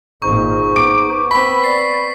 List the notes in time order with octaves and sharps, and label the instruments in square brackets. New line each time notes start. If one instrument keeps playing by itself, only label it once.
[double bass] G#1 A#2 [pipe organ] D#4 G#4 C5 [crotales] C#6
[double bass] B3 [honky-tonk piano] D6 D7
[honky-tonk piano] C4 B5 [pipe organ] E6 [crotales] B6
[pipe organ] D5 [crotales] C7